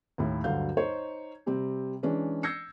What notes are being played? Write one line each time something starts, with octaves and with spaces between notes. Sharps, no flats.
D#2 A2 E4
D2 G2 D3 F#3 F5 G6
D#4 C5 C#5
C3 G3 C4
E3 G#3 C#4 D4
E6 G6 G#6 A#6 C7 C#7